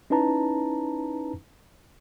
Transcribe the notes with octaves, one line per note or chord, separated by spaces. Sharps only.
C#4 D#4 E4 B4 A5 A#5